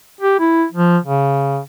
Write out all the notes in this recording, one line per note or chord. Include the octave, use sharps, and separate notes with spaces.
G4
E4
F3
C#3